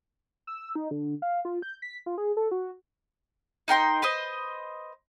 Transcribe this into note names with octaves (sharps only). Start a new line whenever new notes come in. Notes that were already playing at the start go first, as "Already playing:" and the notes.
E6
D#4
D3
F5
F4
G6
B6
F4
G#4
A4
F#4
D#4 A#4 G5 C6
B4 C5 D#5